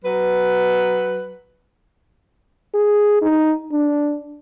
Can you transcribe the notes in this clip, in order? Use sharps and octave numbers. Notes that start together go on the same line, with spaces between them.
F#3 B4
G#4
D#4
D4